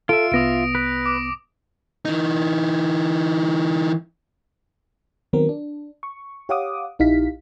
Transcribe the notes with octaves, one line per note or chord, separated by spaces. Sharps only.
F4 A4 E5 D7
C2 B3 D#6 A#6 D7
B4
D6
E3 D#4
D#3 F#3 B3 C4 A#4
D4
C#6
G4 C#5 F5 F#5 D6 D#6
A#1 D#4 E4 G4 F5 B6